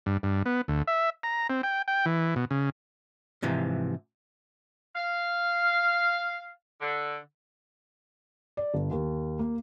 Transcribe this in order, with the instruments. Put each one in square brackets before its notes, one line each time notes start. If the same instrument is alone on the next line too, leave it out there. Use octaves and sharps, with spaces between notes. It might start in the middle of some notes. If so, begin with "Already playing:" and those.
[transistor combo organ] G2
G2
B3
D2
E5
A#5
C4
G5
G5
E3
B2
C#3
[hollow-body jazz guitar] G#2 C3 E3 F3
[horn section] F5
D3
[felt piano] D5
G1
D#2
A#3